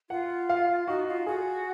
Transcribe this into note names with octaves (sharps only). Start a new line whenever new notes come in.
F4 F#5
F5
D#4 F#4
F4
F#4 G#4